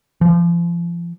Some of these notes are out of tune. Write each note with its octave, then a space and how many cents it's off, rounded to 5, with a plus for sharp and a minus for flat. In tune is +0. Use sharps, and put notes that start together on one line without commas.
F3 -35